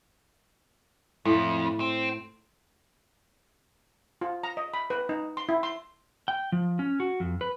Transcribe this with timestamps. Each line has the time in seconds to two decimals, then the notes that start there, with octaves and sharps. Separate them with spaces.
1.25 F2 A2
1.80 C4
4.21 F4
4.43 A#5
4.57 D#5
4.74 B5
4.90 B4
5.09 D#4
5.37 C6
5.49 E4
5.63 C6
6.28 G5
6.52 F3
6.79 C#4
7.00 F#4
7.20 F2
7.41 B4